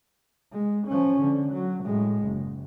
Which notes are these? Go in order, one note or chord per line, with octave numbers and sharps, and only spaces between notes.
G#3
F3 C#4
D3
F#3
A2 G#3
F#1